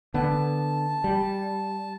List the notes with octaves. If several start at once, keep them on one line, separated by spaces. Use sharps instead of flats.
D3 B3 A5
G3